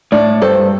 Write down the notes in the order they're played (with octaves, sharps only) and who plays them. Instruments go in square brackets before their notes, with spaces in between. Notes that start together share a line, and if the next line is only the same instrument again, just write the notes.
[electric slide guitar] A2 [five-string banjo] D4
[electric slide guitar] G2 [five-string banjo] A4 C5